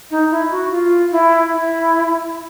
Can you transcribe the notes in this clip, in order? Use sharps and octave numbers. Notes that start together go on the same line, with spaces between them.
D#4
E4
F#4
F4
E4
E4